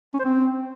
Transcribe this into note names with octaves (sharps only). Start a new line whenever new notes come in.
C#4
C5
C4